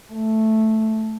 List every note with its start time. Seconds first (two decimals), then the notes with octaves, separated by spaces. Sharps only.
0.12 A3